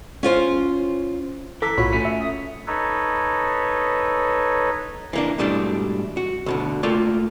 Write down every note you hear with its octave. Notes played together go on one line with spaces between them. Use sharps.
C#4 F4 C5
E3 A4 A#5 D6 E6 B6
B1 A2 F4 F#4 C#5 B5
A3 C#4
E5
D#6
D#4 A4 B4 C#5
E3 A#3 D4
G#2 B2 E3 G3 A3 D4
F#4
D2 B2 D3
A3 A#3 F4 D5